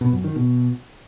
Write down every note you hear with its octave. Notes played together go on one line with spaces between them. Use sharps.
B2
F#2
D#3
B2